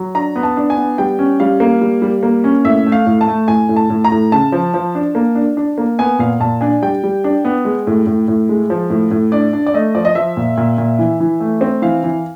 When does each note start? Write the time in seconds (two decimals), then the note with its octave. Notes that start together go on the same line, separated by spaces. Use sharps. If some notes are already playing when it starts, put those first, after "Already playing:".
Already playing: F#3
0.15 D4 A#5
0.36 B3
0.43 A5
0.57 D4
0.70 G#5
0.77 B3
0.98 G3 G5
1.19 C#4
1.40 G3 F5
1.60 A#3
1.81 G3
2.02 G3
2.23 A#3
2.44 C#4
2.64 A2 E5
2.86 A3
2.92 F5
3.06 A2
3.21 A5
3.28 A3
3.48 A2 G#5
3.69 A2
3.76 A5
3.90 A2
4.04 A#5
4.12 A2
4.32 C#3 A5
4.52 F3
4.74 F3
4.95 D4
5.15 A#3
5.35 D4
5.57 D4
5.78 A#3
5.99 B3 G#5
6.19 A#2 F5
6.40 A#2 A5
6.61 D4 G#5
6.82 G3 G5
7.03 G3
7.24 D4
7.45 B3
7.65 G#3
7.87 A2
8.07 A2
8.28 A2
8.49 G#3
8.70 F3
8.90 A2
9.11 A2
9.32 D4 D5
9.53 D4
9.66 D5
9.74 A3 D#5
9.95 F3 D5
10.05 D#5
10.15 F3 E5
10.37 A#2
10.57 A#2
10.78 A#2
10.99 E3
11.20 E3
11.40 A3
11.61 C4
11.82 E3 F5
12.04 E3